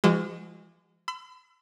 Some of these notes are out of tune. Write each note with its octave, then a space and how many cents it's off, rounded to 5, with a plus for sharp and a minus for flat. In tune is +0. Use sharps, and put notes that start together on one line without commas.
F3 -45 G#3 -25 F#4 +0
B5 +45 E6 +25